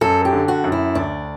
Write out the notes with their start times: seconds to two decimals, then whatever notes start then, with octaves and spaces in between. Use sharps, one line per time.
0.01 F#2 A4
0.25 G4
0.33 D3
0.48 F#4
0.64 F#2
0.72 E4
0.95 D2 D4